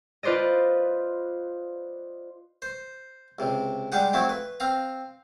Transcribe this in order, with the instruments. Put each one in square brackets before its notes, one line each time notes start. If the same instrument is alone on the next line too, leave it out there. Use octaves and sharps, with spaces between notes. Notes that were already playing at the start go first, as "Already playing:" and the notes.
[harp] F4 B4 C5 D5 D#5
[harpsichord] C5
C#2 C3
G3 G#3 D4 D#4 G4 F#5
F3 F#3 A3 C4 E4
B4
C4 F5 A#5